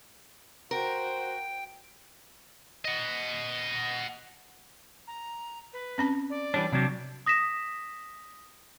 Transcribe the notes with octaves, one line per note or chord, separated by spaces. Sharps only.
F#4 A#4 C5 G5
D#5 F#5
A#5
B4
C4 C#4 A5
D5
E3 G3 D4 C#5
C3 F#3 D4
D#6 A#6 B6 E7